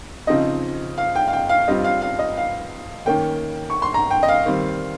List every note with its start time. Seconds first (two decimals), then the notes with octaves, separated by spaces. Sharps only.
0.27 C#3 F3 C4 D#4 D#5
0.98 F5
1.15 G5
1.28 F5
1.33 G5
1.49 F5
1.68 G2 G3 C4 F4 D#5
1.84 F5
2.02 F5
2.19 D#5
2.37 F5
3.06 D#3 A#3 C#4 G5
3.70 C#6
3.82 C6
3.94 A#5
4.10 G5
4.23 D#5
4.28 F5
4.46 D#3 G3 C4